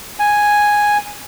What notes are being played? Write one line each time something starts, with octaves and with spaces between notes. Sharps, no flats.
G#5